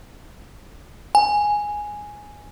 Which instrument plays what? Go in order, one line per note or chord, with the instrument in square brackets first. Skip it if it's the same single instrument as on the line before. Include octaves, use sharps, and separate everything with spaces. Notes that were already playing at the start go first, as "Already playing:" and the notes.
[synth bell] G#5